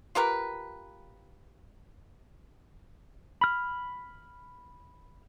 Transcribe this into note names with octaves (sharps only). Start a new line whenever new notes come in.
F4 G4 A#4 B4
B5 F6